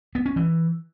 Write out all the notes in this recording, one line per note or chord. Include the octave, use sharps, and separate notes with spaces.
B3
C#4
E3